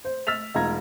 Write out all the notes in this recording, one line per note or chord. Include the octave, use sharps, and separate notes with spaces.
C5
E6 A6 B6 F7
E1 D#4 F4 A#5 G#6